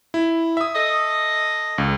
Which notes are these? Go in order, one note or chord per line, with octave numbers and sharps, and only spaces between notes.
E4
E5 D#6
A4 D#5
C#2